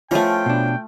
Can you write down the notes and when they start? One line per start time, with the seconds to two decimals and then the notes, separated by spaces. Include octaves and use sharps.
0.11 F3 A3 B3 C#4 F4 G5
0.46 B2 D4